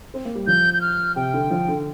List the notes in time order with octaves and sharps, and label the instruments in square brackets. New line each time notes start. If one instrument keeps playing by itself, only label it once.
[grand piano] C4
A#3
G3
[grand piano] F3 [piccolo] G6
[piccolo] G6
F6
[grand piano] C3 [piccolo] G5
[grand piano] D3
F3
D3